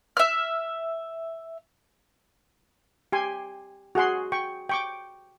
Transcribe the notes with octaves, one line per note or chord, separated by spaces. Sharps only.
E5 F6
G4 G#5 C6
F#4 G#4 F#5 C6
G5 C#6
G5 C#6 D6